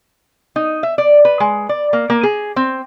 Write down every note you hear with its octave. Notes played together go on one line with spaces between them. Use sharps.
D#4
E5
D5
B4
G#3
D5
A#3
A#3
G#4
C4